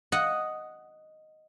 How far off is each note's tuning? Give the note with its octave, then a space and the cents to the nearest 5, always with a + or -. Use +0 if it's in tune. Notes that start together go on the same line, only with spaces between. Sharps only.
D#5 +0 F#5 +0